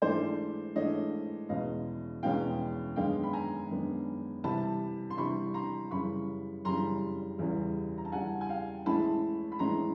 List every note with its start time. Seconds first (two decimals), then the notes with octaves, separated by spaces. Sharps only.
0.02 G#2 E3 A3 D4 C5 D5
0.76 G#2 E3 A3 D4 C#5 D#5
1.49 E2 B2 G#3 C#4 D#5 F5
2.23 E2 B2 G#3 C#4 F5 G5
2.96 F#2 D#3 G#3 B3 D4 F5 G5
3.23 B5
3.33 G#5 A#5
3.70 F#2 D#3 G#3 B3 D4
4.44 C3 E3 G3 A5 B5
5.10 C6
5.17 C3 E3 G3 B5 C#6
5.54 A#5 C6
5.91 F#2 C#3 E3 G3 B5 C#6
6.65 F#2 C#3 E3 G3 A#5 C6
7.39 E2 C#3 E3 G3
7.98 A#5
8.05 A5
8.12 E2 C#3 E3 G3 F#5 G#5
8.41 G#5
8.49 F5 G5
8.86 A2 E3 G#3 C#4 E4 A5 B5
9.52 B5
9.59 A2 E3 G#3 C#4 E4 A#5 C6